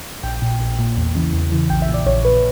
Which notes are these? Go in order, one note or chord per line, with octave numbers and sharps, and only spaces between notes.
A#1 G5
A#2
A#1
A#2
E2
C#3 E3
E2
C#3 E3
A#1 G5
E5
A#2
D5
A#1 C#5
A#2 B4